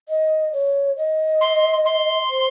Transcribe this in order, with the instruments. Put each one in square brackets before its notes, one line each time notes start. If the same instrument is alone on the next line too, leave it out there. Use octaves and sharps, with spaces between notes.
[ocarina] D#5
C#5
D#5
[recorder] C6
C6
[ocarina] C5